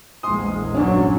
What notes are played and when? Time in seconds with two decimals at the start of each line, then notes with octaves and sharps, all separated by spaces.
0.23 A#1 E2 G#3 C6 D#6
0.74 G1 F#3 C#4 D4